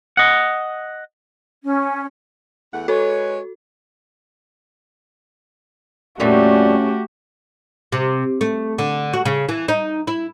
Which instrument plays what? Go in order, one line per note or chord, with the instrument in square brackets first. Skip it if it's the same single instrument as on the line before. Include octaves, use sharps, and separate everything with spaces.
[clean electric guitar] D#5 F#5
[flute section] C#4
[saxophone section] E2 A3 F#5
[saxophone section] G#3 B4 C#5 [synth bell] F#4 A4
[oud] F2 A#2 G3 [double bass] A3 [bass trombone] C#4 [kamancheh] F#4 G4
[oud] C3
A3
D3
F#4
C#3
E3
D#4
E4